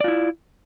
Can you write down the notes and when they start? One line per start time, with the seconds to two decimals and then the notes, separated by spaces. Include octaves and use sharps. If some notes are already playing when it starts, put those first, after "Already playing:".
0.01 D5
0.04 F4
0.08 E4